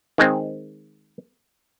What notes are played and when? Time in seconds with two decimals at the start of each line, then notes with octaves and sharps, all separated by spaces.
0.18 D#3 G#3 C4